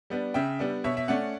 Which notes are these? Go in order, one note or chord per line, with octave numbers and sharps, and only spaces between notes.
G3 B3 D4
C#3 E5 G5
G3 B3 D4
B2 C#5 E5
E5
A3 C#4 D5 F#5